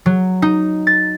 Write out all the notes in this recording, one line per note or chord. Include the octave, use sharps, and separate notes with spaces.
F#3
D#4
A6